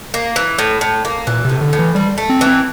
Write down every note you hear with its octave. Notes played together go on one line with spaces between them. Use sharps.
A#3
E3
A2
A2
A#3
A#2 E3
A2 C3
D3
A2
E3
G3 C4
A3
C4
E3
C4